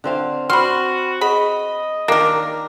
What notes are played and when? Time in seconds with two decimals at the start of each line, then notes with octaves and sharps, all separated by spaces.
0.04 D3 C4 F5
0.50 C4 F#4 B5 C6 F6
1.21 G#4 D#5 B5
2.08 D#3 A#3 D4 G4 A#4